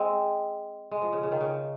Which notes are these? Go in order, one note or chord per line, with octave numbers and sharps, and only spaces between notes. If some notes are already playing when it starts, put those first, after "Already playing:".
Already playing: G#3 C4
G#3
F3
C#3
C#3
D#3
C#3